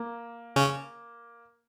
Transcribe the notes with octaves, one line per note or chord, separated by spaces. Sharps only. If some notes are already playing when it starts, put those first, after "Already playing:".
Already playing: A#3
C#3 C#4